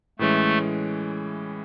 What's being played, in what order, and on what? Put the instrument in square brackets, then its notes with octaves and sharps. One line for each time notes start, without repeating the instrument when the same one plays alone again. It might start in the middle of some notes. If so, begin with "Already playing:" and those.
[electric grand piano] A2 E3 G#3 C#4 [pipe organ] A3